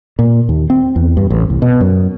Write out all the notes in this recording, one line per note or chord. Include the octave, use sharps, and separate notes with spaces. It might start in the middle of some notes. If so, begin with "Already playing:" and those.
A#2
D#2
C4
E2
G2
A1
C2
B2
F#2